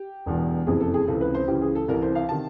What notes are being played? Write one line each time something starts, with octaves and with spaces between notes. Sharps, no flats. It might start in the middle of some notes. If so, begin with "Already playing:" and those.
Already playing: G4
E1 E2 B2
F#1 F2 C3 E3 G#4
A4
G#4
C#2 C3 E3 A4
B4
C5
C#2 C#3 E3 G4
G#4
A4
C2 C3 E3 A#4
C5
F5
C3 D#3 A5